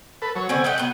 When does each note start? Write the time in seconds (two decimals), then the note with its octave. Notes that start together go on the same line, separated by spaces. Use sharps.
0.22 A4 B4
0.35 F#3 C#5
0.49 D3 B3 C4 G#5
0.65 A3 G4 D#5 F#5 G5
0.78 F#3 B3